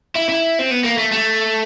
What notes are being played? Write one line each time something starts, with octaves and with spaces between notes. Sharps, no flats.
E4
E4
C4
B3
A#3
A3
A3